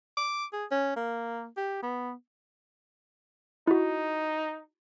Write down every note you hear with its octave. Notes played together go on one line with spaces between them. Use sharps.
D6
G#4
C#4
A#3
G4
B3
D#4 E4 F#4